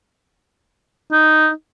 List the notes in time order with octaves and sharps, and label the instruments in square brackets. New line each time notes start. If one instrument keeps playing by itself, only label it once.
[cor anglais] D#4